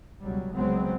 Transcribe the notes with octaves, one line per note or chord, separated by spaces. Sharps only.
C#2 B2 F#3 G3
C2 C#3 F#3 G#3 B3 C4